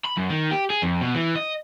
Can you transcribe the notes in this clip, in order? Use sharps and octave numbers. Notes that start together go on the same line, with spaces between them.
B5
F#2
D#3
G4
G#4
F2
B2
E3
D#5